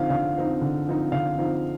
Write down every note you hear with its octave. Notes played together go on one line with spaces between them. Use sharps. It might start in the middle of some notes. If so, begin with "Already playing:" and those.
Already playing: D3 F3 C4 D#4 F5
D3 F5
F3 C4 D#4
D3
F3 C4 D#4
D3 F5
F3 C4 D#4